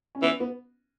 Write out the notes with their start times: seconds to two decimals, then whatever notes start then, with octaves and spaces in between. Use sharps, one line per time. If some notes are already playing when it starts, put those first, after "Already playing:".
0.15 C#4
0.22 E3 B3
0.40 B3